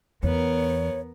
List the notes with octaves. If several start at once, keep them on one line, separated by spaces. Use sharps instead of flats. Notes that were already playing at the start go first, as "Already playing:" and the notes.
E2 B3 A#4 C#5